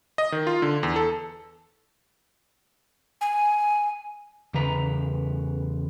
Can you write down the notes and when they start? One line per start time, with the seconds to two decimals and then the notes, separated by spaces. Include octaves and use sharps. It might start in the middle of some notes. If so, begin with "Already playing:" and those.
0.18 D#5
0.32 D#3
0.47 F4
0.62 D3
0.83 E2
0.96 A4
3.21 G#5
4.54 E2 C#3 B4 A#5